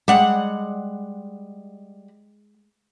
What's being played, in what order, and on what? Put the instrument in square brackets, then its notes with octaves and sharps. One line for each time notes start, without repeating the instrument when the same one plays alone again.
[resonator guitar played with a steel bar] G3 F#5 [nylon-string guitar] G#3